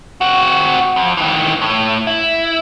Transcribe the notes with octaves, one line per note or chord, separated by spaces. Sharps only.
C4 F#4
F2
D#3 E3
A2
E4